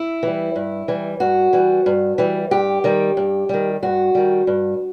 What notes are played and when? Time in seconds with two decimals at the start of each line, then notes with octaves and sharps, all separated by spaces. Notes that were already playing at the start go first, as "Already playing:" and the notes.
Already playing: E4
0.23 E3 G3
0.56 G2
0.88 E3 G3
1.20 G2 F#4
1.53 E3 G3
1.86 G2
2.18 E3 G3
2.51 G2 G4
2.84 D#3 G3
3.17 G2
3.49 D#3 G3
3.82 G2 F#4
4.15 D#3 G3
4.47 G2